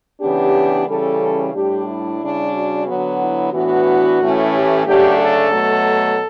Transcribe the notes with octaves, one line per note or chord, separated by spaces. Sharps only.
C#3 E3 B3 D4 G4
C#3 E3 G3 C#4 A4
A2 G3 D4 G4
E4
C#3 G3 D4
F#4
D3 F#3 B3
E4
A2 E3 B3 D4 F#4
A2 E3 A3 C#4
G4
C#3 F#3 A3 D4 G4
A4
B2 F#3 A3